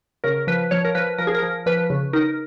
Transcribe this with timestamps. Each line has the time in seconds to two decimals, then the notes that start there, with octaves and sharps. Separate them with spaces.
0.24 C#3 A#4
0.47 F3 B4
0.71 F3 C#5
0.85 A#4
0.95 F3 B4
1.18 F3 A#4
1.27 G#4
1.35 A#4
1.42 F3
1.66 F3 B4
1.90 C#3
2.13 D#4 A#4